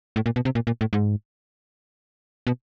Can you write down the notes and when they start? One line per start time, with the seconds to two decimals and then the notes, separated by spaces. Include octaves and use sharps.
0.16 A2
0.26 A#2
0.36 B2
0.45 C3
0.55 A#2
0.67 A#2
0.81 A2
0.93 G#2
2.47 B2